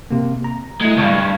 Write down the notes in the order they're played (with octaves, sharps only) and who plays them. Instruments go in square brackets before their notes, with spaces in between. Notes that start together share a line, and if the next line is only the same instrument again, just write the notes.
[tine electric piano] C3 A#3
A#5
[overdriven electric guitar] G#3 [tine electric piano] A3 E4
[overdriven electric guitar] C#2 G2 [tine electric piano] A5 C#6 G#6